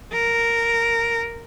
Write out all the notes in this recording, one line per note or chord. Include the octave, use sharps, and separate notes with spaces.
A#4